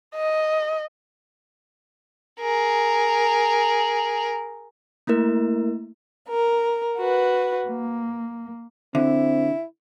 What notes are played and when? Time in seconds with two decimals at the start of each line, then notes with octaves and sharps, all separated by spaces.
0.15 D#5
2.41 G#4 A#4
5.07 A3 A#3 E4 A#4
6.29 A#4
6.97 F#4 B4
7.68 A#3
8.95 D3 C4 E4